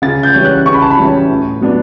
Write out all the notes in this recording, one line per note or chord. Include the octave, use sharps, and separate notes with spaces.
C#3 A6
G6
E3 G3 C#4
F#6
C#3 C#6
B5
A5
B5
E3 G3 C#4
A2
F#3 B3 D4